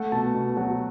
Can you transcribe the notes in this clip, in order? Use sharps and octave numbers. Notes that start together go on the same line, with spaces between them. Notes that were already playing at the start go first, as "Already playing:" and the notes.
Already playing: A3 F#5
B2 A5
B2
F#3 F#5